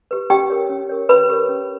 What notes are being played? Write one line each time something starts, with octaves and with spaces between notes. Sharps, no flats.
G4 B4
C#4 G4 G5
G4 A#4 C#5
C#4
G4 A#4 C#5
C#4 B4 B5
G4 A#4 C#5
C#4